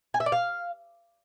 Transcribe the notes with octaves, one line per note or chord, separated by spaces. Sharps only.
G#5
E5
D5
F5